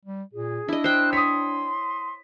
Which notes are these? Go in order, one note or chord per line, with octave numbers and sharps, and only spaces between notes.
G3
A#2 G#4
D4 E4 D#5
C5 G5 F#6
C#5 C6 D#6 B6